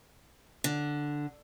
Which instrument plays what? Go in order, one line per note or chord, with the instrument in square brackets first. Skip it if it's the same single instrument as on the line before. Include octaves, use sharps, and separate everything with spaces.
[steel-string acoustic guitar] D3